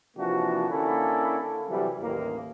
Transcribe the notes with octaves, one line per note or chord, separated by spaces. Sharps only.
C3 E3 F3 A#3 D4 F#4
D3 A#3 C#4 E4 A4
C3 E3 F#3 G3
A1 D#2 A#3